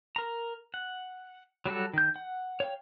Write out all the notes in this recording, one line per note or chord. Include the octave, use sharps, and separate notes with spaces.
A#4 A#5
F#5
F#3 G3 F#4 A4
D#3 G6
F#5
C#5 F5 G5